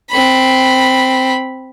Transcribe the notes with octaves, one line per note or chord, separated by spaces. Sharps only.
C4 B5